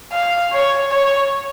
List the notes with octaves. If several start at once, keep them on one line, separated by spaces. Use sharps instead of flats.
F5
C#5
C#5